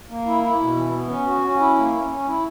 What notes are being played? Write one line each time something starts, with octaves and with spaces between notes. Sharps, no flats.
A#3
E4
E4
B2
E3
B3
C#4
F#4
C#4
E4
A#3
C#4
C#4
E4